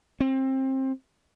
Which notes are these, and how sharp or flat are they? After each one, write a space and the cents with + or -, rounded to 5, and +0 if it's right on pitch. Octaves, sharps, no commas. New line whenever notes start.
C4 +25